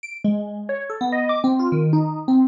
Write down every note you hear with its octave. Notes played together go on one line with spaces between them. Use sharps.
D7
G#3
C#5
A4
B3
D#5
D6
C4
F4
D#3
D#4
C4